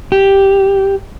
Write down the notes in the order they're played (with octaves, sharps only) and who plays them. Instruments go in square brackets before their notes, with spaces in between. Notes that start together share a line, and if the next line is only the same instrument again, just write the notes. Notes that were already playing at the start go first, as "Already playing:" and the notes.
[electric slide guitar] G4